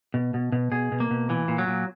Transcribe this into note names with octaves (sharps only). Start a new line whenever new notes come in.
B2
B2
B2
B2 G#4
B2
A#3
B2
A#2 E3
A#2
F#3
A#2